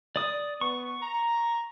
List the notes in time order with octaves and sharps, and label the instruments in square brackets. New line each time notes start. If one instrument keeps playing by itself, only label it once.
[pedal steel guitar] D5 D#6
[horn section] B3 [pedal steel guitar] C#6
[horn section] A#5